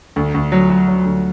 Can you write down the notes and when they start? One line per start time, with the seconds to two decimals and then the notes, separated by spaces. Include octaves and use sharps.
0.16 D2
0.34 D2
0.52 F#3
0.70 F#3
0.88 F#3
1.05 D2